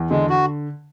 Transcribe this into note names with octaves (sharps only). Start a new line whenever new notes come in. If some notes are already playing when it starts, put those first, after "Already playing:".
Already playing: E2
D3 G#3
F#4